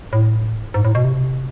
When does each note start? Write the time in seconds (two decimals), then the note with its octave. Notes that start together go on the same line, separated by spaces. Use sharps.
0.13 A2
0.74 G#2
0.85 A2
0.95 B2
1.04 C3